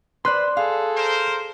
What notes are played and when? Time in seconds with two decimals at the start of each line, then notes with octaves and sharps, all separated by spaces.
0.25 B4 C5 D5 C6 F#6
0.57 G#4 A4 F5
0.96 A#4 C5